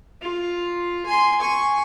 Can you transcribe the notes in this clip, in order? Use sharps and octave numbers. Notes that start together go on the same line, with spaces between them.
F4
G#5 C6
G#5 C#6